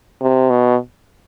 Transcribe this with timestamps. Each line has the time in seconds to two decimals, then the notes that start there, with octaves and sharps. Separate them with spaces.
0.21 C3
0.50 B2